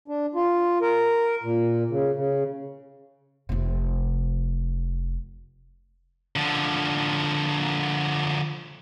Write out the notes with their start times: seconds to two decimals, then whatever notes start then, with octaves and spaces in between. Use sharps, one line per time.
0.08 D4
0.35 F4
0.82 A#4
1.43 A#2
1.90 C#3
2.15 C#3
3.49 F1 C3
6.36 D3 F3